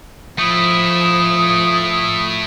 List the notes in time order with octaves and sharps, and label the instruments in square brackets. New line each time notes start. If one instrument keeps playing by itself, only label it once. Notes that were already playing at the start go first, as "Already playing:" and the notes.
[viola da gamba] F3 [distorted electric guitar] A3 E4 [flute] D#6